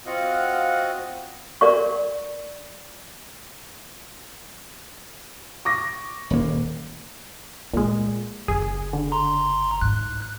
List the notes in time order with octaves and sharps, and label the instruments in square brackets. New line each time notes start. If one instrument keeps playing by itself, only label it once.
[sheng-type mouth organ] C4 F4 F#4 D#5 F5 F#5
[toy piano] A#4 D5 C#6
[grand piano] C#6 D6 A#6
[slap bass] D#1 A#3
[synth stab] A#2 G#3 [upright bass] F4
[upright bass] F#1 [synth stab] G#4
[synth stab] D3
[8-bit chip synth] A#5 C6
[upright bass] G#2 [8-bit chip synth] F#6